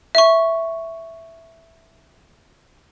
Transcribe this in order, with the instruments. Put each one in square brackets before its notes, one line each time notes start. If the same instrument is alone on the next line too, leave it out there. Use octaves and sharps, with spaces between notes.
[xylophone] E5 C#6